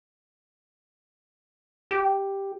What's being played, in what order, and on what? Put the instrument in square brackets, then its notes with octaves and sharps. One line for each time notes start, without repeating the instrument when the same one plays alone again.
[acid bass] G4